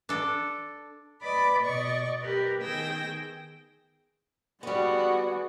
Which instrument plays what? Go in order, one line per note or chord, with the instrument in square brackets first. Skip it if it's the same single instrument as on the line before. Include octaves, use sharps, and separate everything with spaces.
[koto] D4 A4
[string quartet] B4 D5 D#5 B5 D6
B2 D5 D#5 C#6 D6
G4 A#4 B4
D#3 B3 G#4 G5 E6 A#6
[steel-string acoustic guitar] G3 B3 [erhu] F#4 [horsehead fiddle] G#4 D5